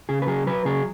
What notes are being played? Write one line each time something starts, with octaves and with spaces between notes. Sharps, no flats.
C#3 G#4
B4
F#3 G#4
F#3 B4
C#3 G#4